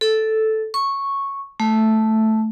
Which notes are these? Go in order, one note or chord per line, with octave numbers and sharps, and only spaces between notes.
A4
C#6
A3